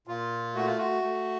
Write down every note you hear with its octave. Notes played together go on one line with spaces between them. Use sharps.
A#2 F4
A3 F#4
F4
F#4
A3